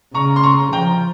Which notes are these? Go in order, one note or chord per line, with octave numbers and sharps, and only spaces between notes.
C#3 A#5 C#6
C6
A#5 C#6
F3 G5 A#5